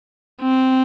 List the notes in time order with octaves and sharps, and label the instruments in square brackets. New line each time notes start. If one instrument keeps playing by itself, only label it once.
[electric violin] C4